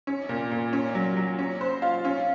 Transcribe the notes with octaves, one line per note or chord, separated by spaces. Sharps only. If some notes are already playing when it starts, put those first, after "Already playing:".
C#4
A#2
A#2
C#4
F#3
F#3
C#4
C5
F4
C#4